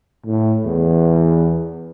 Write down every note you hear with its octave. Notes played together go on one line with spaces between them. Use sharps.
A2
E2